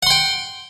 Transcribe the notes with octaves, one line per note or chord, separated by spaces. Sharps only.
F#5 G5 C6